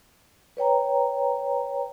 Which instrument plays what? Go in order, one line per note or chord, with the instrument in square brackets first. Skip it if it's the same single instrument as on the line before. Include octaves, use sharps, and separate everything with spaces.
[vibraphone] B4 C#5 G5 A#5